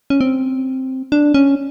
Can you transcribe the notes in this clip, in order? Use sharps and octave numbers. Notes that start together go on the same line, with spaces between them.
C#4
C4
D4
C#4